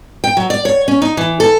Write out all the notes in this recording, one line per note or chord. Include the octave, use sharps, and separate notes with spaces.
G5
F#3
D5
C#5
C#4
D#4
E3
A4